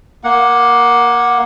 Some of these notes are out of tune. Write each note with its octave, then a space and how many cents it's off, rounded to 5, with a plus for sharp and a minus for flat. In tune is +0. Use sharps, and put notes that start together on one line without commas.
A#3 +15 F#5 -10